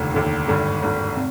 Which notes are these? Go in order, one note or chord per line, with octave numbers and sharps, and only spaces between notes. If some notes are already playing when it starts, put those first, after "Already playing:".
Already playing: F1 D#2 D3
F1 D#2 D3
G#1 G2 D3
G#1 G2 D3
C3